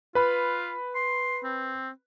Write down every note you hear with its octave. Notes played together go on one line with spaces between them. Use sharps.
F4 B4 B5
C6
C4